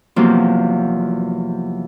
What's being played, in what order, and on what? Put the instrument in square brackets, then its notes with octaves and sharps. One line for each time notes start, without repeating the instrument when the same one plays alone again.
[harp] E2 C3 F3 F#3 A#3 C4